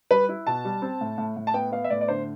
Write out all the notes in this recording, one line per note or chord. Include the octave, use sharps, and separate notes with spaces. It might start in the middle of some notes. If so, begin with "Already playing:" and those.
G3 B4
E4
B2 A5
G3
C4
A2
A2
A2
A5
B3 G5
B3 F5
E5
A2 D5
D5
D3 C5